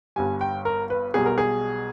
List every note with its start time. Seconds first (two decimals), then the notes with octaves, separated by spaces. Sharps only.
0.16 G1 G2 G3 G#5
0.41 G5
0.65 A#4
0.90 B4
1.14 B1 B2 G3 G#4
1.26 A#4
1.38 G#4